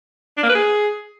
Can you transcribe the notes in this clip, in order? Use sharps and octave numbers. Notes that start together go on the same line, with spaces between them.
D4
A#3
B4
G#4